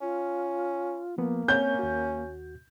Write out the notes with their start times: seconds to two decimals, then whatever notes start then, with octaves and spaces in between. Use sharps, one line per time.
0.01 C#4 F4
1.18 F3 A#3 B3
1.48 C4 C#4 C#5 G6
1.79 D#2 F#4